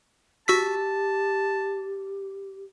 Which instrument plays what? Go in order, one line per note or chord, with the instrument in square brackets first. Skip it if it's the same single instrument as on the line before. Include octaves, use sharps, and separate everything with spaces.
[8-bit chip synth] F#4 E6 B6 [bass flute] G4 [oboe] A5